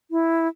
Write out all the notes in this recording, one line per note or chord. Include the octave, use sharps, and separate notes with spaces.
E4